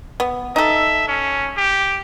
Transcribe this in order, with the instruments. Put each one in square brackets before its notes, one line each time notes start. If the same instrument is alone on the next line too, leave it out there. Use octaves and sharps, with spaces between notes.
[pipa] B3
[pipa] D#4 A4 [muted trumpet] E5
[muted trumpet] C#4
G4